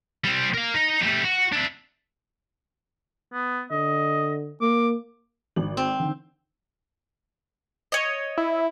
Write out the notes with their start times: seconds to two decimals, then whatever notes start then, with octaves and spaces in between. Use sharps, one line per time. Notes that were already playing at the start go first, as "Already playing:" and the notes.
0.24 G3 C4
0.54 A#4 F5
0.74 D#4
1.03 G3 A3
1.25 F#4
1.53 D4 E4
3.33 B3
3.71 D3 D#5
4.61 A#3 D6
5.56 G#1 F#7
5.77 C4
6.00 D3 D#3
7.92 C#5 D#5
8.37 E4